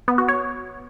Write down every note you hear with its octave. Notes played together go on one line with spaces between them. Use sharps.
B3
F#4
C#5